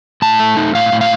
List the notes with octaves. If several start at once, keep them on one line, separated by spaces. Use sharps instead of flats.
A2 A5
A3
D#4
A2 F5
A2
F5